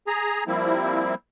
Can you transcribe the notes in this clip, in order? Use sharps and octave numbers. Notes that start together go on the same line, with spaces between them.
G#4 A#5
F3 G3 A#3 C4 E4